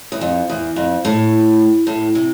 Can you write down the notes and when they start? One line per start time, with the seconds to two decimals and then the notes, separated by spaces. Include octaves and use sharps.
0.12 E2
0.21 F2
0.49 E2
0.76 F2
1.05 A2
1.87 A2
2.15 C3